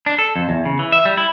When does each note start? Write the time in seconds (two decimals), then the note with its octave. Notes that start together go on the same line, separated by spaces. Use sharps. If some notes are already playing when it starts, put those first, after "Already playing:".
0.06 D4
0.19 A4
0.36 F2
0.49 E2
0.65 C#3
0.79 E3
0.92 E5
1.05 G3
1.17 E4